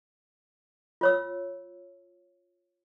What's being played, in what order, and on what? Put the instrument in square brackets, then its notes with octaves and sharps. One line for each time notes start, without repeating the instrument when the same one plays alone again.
[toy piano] F4 C#5 E6